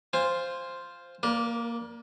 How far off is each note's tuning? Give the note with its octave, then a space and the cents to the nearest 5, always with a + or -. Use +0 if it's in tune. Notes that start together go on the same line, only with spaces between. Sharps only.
F4 +0 C5 +0 G#5 -30
A#3 +0 A#4 +40 D5 -5